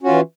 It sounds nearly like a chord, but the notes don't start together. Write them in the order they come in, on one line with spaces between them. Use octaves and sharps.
C#4 F#4 F4 E3